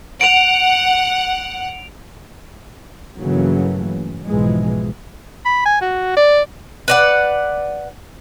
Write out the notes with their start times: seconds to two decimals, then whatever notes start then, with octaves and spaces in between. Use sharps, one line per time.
0.21 F#5 D7 F7
3.18 G2 C#3 E3 F#3 A3 A#3
4.26 B1 G#2 E3 F3 G#3
5.45 B5
5.66 G#5
5.81 F#4
6.16 D5
6.88 B4 D5 F#5